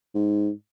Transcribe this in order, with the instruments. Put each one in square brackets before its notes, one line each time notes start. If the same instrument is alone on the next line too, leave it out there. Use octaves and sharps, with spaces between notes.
[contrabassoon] G#2